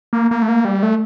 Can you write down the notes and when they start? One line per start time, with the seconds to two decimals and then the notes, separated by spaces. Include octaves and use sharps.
0.13 A#3
0.31 A#3
0.42 A3
0.49 A#3
0.65 G3
0.83 A3